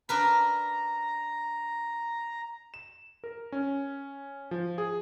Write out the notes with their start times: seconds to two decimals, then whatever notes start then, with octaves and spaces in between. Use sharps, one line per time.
0.09 D4 A#4 B4 A#5
2.74 E7
3.24 A#4
3.52 C#4
4.51 F3
4.78 G#4